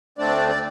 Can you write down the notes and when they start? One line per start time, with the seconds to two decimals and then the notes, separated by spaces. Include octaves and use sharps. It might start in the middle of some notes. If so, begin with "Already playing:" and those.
0.18 D2 D3 A3 C4 D4 D5
0.48 D5